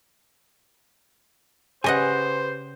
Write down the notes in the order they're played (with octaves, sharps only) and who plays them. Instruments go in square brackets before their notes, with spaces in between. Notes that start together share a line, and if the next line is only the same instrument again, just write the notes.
[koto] C#3 D#5 F#5 [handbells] G4 B4 [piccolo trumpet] C5 [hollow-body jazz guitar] G#5